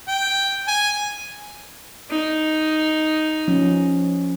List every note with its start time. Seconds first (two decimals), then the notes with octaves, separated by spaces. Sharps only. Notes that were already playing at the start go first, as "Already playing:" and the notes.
0.08 G5
0.68 G#5
2.10 D#4
3.48 F3 C#4